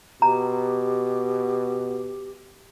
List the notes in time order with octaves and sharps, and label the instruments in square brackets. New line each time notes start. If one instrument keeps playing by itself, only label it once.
[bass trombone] B2 [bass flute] G4 [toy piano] A#5